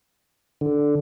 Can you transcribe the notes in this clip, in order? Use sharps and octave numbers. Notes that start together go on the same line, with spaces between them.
D3